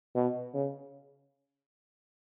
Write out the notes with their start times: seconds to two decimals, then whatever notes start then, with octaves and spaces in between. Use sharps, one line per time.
0.15 B2
0.54 C#3